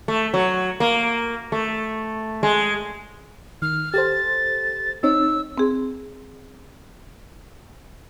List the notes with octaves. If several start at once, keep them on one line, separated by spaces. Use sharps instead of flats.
A3
F#3
A#3
A3
G#3
D#3 F6
G4 A4 C5 A6
C4 D#4 C#5 E6
C4 G#4